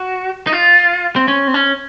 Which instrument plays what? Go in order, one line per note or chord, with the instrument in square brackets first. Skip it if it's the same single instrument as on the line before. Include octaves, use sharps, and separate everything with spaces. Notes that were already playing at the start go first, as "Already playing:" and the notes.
Already playing: [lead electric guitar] F#4
D#4
F4
C4
C#4
C4
C#4